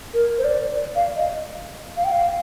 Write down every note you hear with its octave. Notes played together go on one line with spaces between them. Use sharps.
A#4
C5
D5
D5
F5
D#5
F5
G5
F5